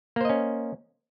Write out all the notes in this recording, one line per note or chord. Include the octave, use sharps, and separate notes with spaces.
A#3 C#4 C5 D#5